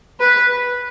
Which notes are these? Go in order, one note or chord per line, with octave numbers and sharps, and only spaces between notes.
B4